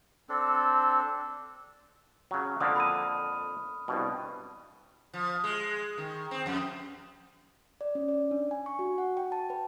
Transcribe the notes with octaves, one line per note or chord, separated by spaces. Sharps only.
C4 D4 A4
C#3 F#3
F2 D3 A#3 D#6 F6
B5 D#6 D#7
C2 G2 B2
F3
G#3
D#3
C4
F2
D5
C#4
D5
D4
G#5
C#6
F#4
F#5
G5
A5
B4